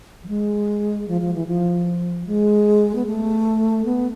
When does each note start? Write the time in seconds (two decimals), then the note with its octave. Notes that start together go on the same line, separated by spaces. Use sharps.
0.24 F3
0.28 G#3
1.08 F3
1.21 F3
1.34 E3
1.47 F3
2.27 G#3
2.95 B3
3.06 A3
3.85 B3